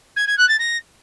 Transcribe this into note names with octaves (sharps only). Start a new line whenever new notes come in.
G#6
G#6
F#6
A6
A#6